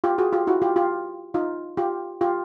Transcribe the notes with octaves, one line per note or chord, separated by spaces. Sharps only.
F4 G4
F#4 G#4
F4 G4
E4 F#4
F4 G4
F4 G4
D#4 F4
F4 G4
F4 G4